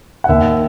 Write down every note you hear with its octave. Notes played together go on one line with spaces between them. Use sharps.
F#5
D#2 E5